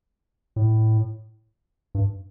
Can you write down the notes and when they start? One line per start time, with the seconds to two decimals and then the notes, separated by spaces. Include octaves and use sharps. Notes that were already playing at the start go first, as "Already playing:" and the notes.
0.56 A2
1.95 G2